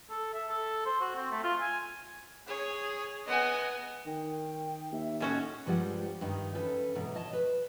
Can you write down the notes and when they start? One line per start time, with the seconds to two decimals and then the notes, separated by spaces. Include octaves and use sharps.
0.10 A4
0.33 E5
0.49 A4
0.86 C5
1.01 F#4
1.16 C4
1.31 A3
1.43 F4
1.61 G#5
2.47 G#4 C#5
3.27 B3 D#5 F#5 G#5
4.06 D#3 G5
4.92 D#2 E5
5.20 A2 C#4 F#4 D#5
5.65 G2 D3 F3 G3 G#3 F#5
6.21 G2 D#3 D#4
6.54 E3 C#4 A4 B4
6.95 G#2 B2 E3 F#3
7.15 C#5 D#5 A5
7.33 B4